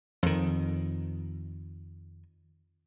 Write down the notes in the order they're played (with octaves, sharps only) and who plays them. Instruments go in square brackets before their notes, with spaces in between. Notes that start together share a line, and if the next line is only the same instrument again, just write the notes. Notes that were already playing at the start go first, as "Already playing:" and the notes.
[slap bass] F2 D#3